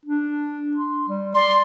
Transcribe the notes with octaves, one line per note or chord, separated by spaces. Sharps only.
D4
C6
G3
D5 C6